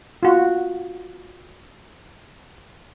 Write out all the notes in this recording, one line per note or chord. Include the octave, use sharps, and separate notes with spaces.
F4 F#4